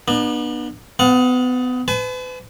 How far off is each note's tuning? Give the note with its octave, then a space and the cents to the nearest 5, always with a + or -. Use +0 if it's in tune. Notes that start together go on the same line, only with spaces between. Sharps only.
B3 -35 D4 +40
B3 +30 F#5 -35
B4 +35 A5 -45